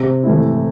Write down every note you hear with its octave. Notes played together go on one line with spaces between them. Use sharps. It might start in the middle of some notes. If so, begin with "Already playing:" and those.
Already playing: C3
E3 A3 E4